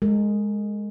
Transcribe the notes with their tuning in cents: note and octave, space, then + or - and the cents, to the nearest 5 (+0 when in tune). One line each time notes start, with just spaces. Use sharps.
G#3 +0 A#4 -40